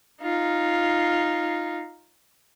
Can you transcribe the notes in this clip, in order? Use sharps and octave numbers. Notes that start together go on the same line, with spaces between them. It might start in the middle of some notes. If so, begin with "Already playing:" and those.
D#4 F4